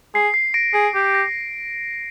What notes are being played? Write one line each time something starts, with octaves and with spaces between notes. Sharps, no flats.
G#4 C7
C7
A#6 D7
G#4 C7
G4
A#6